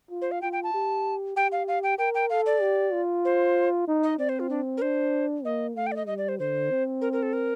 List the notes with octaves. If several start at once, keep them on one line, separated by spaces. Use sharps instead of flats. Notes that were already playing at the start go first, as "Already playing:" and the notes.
F4
C5
F5
F4 G5
G5
A5
G4
G4 G5
F5
F5
G5
A#4 G5
G5
A4 F5
D5
G4
F4
C5
D#4
D#5
C4 D5
C5
F4
D4
A#4
D4 C5
A#3 D#5
A3 F5
G5
D5
D#5
G3 D#5
D5
C5
D3 C5
C4
A#4
A#4
A4
A#4